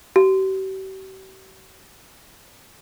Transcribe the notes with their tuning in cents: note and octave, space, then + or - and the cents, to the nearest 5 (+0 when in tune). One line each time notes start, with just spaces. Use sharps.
G4 -45